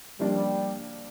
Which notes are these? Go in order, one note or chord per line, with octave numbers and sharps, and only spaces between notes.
F3 G3 A#3 D4